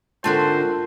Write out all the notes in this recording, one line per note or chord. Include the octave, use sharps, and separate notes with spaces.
G#2 D3 A3 C4 F4 F#4 A#4 C5